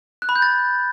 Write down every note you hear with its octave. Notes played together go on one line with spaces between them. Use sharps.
F#6
B5
G6
A6